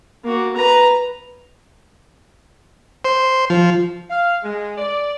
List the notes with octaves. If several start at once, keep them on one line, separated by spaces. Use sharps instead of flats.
A#3 F#4
B4 A#5
C5
F3
F5
G#3
D5